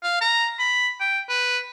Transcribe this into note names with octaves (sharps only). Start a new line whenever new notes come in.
F5
A#5
B5
G5
B4